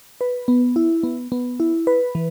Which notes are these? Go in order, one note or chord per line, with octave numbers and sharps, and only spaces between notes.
B4
B3
E4
B3
B3
E4
B4
E3